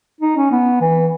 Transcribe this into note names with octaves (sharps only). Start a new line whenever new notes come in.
D#4
C#4
B3
E3